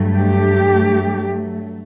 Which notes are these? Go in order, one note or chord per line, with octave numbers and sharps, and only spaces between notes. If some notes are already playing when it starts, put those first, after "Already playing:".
Already playing: G2 F#3 A3
G4